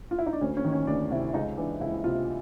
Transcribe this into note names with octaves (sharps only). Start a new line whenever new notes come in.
F4
E4
D#4
D4
D2 C#4
C#4
D#3
C#4
D2 D4
C3 E4
C#2 D#4
E3 D4
C#2 E4
C3 F4